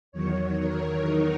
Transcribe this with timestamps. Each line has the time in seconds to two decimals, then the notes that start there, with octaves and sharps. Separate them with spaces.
0.12 E2 D#3 F#3 C#5
0.60 A#4
1.06 D#4